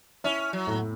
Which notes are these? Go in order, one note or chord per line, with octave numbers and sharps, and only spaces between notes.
C#4 E4
F#3
A2